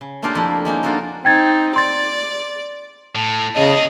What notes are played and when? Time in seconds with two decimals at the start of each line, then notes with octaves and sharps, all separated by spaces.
0.01 C#3
0.22 A3 A#3 D4 F4 G4 A#4
0.35 F2 E4
0.65 G#3 A#3 C#4 D#4
0.83 A#3 D4 F4 F#4 A4 A#4
1.25 C4 D#4 G5 G#6 A6
1.76 D5 C6 A6
3.15 A2 A5
3.56 E2 C#3 G#4 D#5